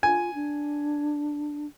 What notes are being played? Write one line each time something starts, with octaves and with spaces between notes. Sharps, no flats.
F4 G#5
D4